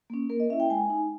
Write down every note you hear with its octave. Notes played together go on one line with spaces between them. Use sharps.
A#3 C#4
A#3 A#4
D#5
C#4 E4 E5
G5
G#3 G#5
D#4